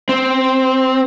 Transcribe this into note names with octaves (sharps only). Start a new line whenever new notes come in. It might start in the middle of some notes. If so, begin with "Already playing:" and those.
C4